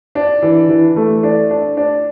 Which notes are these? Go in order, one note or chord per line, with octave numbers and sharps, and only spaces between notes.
D4
E3
E3
A3
D4
D4
D4